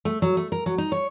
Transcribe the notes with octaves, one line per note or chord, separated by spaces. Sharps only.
A3
F#3
A3
A#4
F#3
D#4
C#5